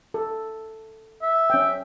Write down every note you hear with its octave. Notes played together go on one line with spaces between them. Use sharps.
A4
E5
C#4 G5